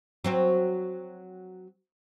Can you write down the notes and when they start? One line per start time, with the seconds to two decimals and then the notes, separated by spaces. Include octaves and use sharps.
0.24 F#3 C4 F#4